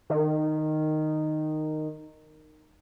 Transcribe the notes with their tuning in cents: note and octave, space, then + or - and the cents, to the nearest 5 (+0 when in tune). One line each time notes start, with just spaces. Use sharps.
D#3 -10